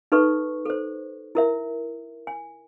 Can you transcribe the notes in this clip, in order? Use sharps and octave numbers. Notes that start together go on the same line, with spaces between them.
D#4 A4 B4 C#6
A4 C5
E4 A#4 E5
G#5